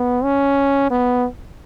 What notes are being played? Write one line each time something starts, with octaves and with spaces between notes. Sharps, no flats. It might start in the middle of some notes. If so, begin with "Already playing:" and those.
Already playing: B3
C#4
B3